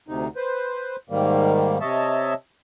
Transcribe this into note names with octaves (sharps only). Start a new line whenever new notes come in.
D2 C3 D#4
B4 C5
G#2 D#3 G3 A#3
C3 C#5 D#5 E5 A5